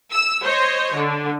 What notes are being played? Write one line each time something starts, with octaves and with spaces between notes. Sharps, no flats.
E6
C5 C#5 D#5
D3